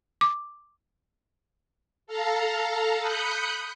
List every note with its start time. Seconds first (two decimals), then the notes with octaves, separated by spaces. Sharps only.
0.21 D6
2.07 A4 F5 A5 A#5
2.99 B5 D#6 F#6 G6 C#7